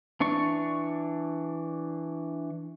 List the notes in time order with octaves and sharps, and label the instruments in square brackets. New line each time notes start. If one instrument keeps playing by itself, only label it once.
[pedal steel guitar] E3 D4 D5 C#6